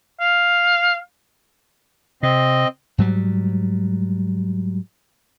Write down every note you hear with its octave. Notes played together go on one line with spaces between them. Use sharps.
F5
C3 C4 D#5
G#2 F#3 G3